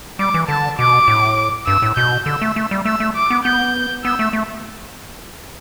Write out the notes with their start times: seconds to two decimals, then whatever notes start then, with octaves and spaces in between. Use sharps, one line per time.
0.19 G3 D6
0.34 E3
0.48 D3 A5
0.79 B2 D6
1.08 A2
1.67 G2 E6
1.82 A2
1.97 B2 G6
2.26 D3 E6
2.41 A3
2.56 A3
2.71 G3
2.85 A3 E6
3.00 A3
3.16 D6
3.30 B3
3.45 B3 G6
4.04 B3 E6
4.19 A3
4.33 A3